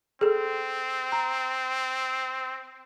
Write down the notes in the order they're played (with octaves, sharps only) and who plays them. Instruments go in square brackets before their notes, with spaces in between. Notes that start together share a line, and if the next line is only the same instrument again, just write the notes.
[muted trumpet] C4 [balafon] G#4 A4
[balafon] A#5